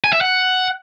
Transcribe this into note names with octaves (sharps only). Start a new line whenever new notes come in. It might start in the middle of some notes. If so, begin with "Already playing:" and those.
G#5
E5
F#5